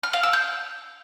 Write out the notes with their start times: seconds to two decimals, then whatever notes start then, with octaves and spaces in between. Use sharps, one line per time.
0.03 F6
0.13 F5
0.23 E6
0.33 G6